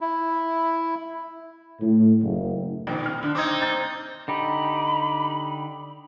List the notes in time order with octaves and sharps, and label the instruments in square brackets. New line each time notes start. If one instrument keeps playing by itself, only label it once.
[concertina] E4
[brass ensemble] A2
F#1
[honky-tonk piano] A#1 D#3 [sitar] B2
[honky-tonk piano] F6
[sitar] D3
[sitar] C4 D#4 [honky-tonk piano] D6 D#6 G#6
[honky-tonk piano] A#5 G6 A6
[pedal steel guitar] D3 D#4 G4 [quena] B5